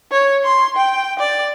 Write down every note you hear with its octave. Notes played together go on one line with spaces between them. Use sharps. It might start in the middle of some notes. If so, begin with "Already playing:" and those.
C#5
C6
G5
D5